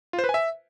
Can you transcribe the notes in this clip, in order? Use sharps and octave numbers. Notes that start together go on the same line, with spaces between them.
F4
C5
B4
G#5
E5